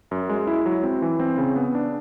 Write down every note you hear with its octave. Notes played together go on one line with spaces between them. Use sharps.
F#2
G#3
E4
F#3
C4
E3
C4
C#3
B3
D4